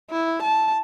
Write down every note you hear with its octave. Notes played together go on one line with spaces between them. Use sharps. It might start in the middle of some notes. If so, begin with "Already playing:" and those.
E4
A5